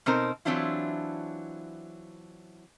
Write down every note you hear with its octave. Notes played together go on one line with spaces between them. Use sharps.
B2 C4 D#4 A#4 C5
E3 F#3 C4 D4 E4 F4